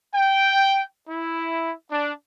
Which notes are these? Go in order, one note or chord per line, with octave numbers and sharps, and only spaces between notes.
G5
E4
D4